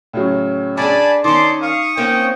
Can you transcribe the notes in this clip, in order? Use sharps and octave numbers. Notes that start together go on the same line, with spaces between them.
A2 C#3 F#3
D4 G#4 D5 G#5 A5 B5
D#3 C#4 D#4 D5 A5 C6 D6
F5 C#6 D#6
A#3 C4 C#4 G5